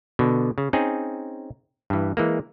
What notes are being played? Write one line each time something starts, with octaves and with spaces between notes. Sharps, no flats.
B2 D3
C#3
C4 C#4 D#4 G#4
G2 E3
E3 G#3 A#3